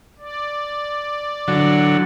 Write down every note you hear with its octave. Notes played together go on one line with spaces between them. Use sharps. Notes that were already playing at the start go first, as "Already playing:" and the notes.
D5
D3 F#3